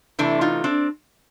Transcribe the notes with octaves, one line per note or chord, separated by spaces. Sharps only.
C3 E3 A3 D4 E4
D#4 F4
C4 D4